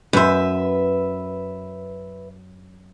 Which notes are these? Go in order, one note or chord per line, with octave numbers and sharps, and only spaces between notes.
F#2 B4 C5 E5